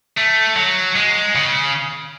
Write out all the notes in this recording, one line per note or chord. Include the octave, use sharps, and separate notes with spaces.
A3
F#3
G#3
C#3